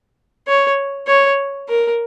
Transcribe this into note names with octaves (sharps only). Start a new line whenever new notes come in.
C#5
C#5
A#4